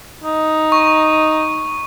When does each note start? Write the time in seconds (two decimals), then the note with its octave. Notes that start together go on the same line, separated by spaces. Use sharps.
0.24 D#4
0.72 C#6